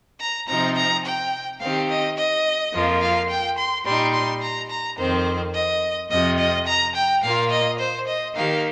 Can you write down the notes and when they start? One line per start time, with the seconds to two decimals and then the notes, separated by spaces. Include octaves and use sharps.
0.20 A#5
0.48 C3 F3 C4 D#4 A#5
0.76 A#5
1.05 G5
1.60 D#3 C4 G4 F5
1.89 D#5
2.17 D#5
2.73 F2 F3 A#3 F4
3.02 F5
3.30 G5
3.58 C6
3.85 A#2 G3 D#4 C6
4.14 C6
4.42 A#5
4.70 A#5
4.98 F2 D#3 C4 C5
5.54 D#5
6.10 F2 C3 F3 D#5
6.38 D#5
6.67 A#5
6.95 G5
7.23 A#2 A#3 F4 F5
7.51 D#5
7.79 C5
8.07 D#5
8.35 D#3 A#3 G4 F5